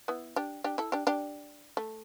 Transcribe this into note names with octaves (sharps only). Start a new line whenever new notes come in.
B3 E4
D4 G4
D4 G4
E4 A4
D4 G4
D4 G4
A3